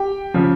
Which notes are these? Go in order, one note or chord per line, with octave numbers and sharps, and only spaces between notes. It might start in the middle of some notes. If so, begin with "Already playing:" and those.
Already playing: G4 G5
C#3 F3